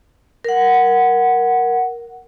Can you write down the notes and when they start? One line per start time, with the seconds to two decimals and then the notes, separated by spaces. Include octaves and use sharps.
0.44 A#4 F#5